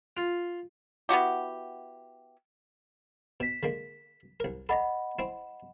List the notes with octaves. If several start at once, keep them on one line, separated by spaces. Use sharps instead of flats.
F4
B3 E4 F#4 G4
B2 B6 E7
D3 G#3 A#3
C2 A#4
A4 D5 D#5 F#5 A#5 B5
C4 E4